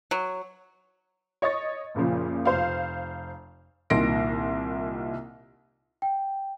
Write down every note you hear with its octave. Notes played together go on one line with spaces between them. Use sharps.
F#3
C#5 D#5 C#6 A6
F#1 A#2 C#3 F3
F1 C5 F5
C2 A#2 D#3 C6 A#6 D7
G5